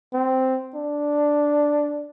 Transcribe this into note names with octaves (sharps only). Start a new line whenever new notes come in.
C4
D4